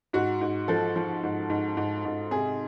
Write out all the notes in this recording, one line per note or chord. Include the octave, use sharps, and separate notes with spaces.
G#2 F#4
G#2
F3 A4
F3
G#2
G#2
G#2
G#2
C3 G#4